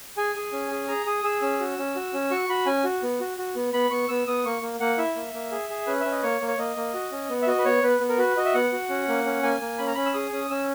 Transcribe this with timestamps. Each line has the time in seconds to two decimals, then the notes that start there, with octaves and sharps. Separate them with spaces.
0.17 G#4 G#5
0.36 G#4
0.52 C#4
0.71 G#4
0.88 G#4 A#5
1.06 G#4 D#6
1.24 G#4 E6
1.42 C#4 E6
1.60 F#4
1.78 C#4
1.96 F#4
2.13 C#4
2.31 F#4 C#6
2.49 F#4 B5
2.66 C#4 G#5
2.84 F#4
3.03 B3
3.20 F#4
3.38 F#4
3.55 B3
3.73 B3 B5
3.91 B3 C#6
4.09 B3 E6
4.27 B3 D#6
4.45 A#3 C#6
4.62 A#3
4.80 A#3 F#5
4.98 E4 E5
5.16 A#3
5.34 A#3
5.51 G#4
5.69 G#4
5.87 C#4 B4
6.00 C#4 E5
6.12 D#5
6.23 A#3 C#5
6.41 A#3
6.48 C#5
6.58 A#3 D#5
6.76 A#3
6.94 F#4
7.12 C#4
7.29 B3
7.42 E5
7.47 F#4 D#5
7.58 B4
7.65 B3 C#5
7.83 B3 B4
8.00 B3
8.09 A#4
8.18 F#4 B4
8.37 F#4 D#5
8.46 E5
8.54 B3 F#5
8.72 F#4
8.89 C#4
9.08 A#3
9.26 C#4
9.43 A#3 G#5
9.61 A#3
9.78 C#4 B5
9.87 A#5
9.94 C#4 B5
10.06 E6
10.14 G#4 D#6
10.32 C#4 D#6
10.50 C#4 E6